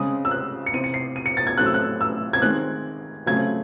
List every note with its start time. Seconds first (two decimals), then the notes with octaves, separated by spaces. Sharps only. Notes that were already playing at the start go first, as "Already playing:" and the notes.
Already playing: C#3 G#3 C4 D#6
0.25 E6
0.31 F#6
0.66 C#7
0.73 C3 E3 C4 D#7
0.84 C#7
0.94 C7
1.16 D#7
1.26 C#7
1.37 A6
1.47 G#6
1.57 A2 F#3 A3 C4 F#6
1.66 E6
1.74 F#6
2.01 E6
2.33 G#6
2.42 D#3 G#3 C4 F#6
3.26 C#3 F#3 A3 C4 G#6